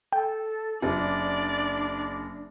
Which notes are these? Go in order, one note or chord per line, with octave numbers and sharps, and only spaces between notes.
A4 G5
F#1 D4 D5